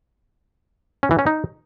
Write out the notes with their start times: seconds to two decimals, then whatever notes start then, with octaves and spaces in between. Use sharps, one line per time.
1.03 C#4
1.11 E3
1.19 C#4
1.26 D#4